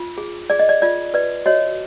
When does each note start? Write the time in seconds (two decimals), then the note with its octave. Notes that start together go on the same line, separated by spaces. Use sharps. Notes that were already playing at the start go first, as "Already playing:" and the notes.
Already playing: F4
0.18 G#4
0.50 G#4 D5
0.59 D#5
0.69 D5
0.82 F4 D5
1.14 B4 D5
1.46 F#4 C#5 D#5